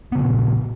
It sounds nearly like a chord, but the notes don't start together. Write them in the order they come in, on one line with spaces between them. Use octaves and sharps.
B3 C#3 F3 A#2